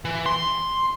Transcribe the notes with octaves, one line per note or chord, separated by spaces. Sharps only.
E3
C6